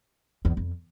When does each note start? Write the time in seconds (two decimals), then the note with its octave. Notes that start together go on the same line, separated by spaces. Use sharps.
0.45 E2
0.57 F2